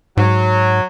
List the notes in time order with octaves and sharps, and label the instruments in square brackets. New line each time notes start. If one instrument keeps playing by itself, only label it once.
[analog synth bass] G#2 [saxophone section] F#3